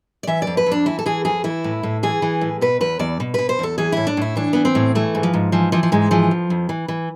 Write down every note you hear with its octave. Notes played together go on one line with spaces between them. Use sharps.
D5
E3 E5
D5
F2
B4
F2
D4
E3 E4
A4
E3 G#4
F2 G#4
E3 E4
A2
A2
E3 G#4
E3
A2
B2 B4
E2 B4
E2 D5
B2
B2 B4
C5
E2 A4
E3 G#4
A2 E4
D4
A2 E4
E3 D4
E3 B3
C4
A2
E3 A3
G#2
F3
G#2
E3 F3
E3 F3
F3
G#2 G#3
E3 F3
F2
F2
E3
E3